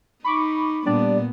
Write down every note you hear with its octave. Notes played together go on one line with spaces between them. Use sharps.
D#4 B5 C#6 D6
A#2 G3 B3 D4 D5